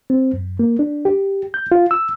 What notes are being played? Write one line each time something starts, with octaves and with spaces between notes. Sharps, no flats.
C4
F#2
A#3
D4
G4
G6
F4
E6